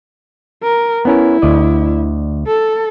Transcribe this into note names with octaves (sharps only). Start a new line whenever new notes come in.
A#4
B3 C#4 E4 A#4
D2 D5 D#5
A4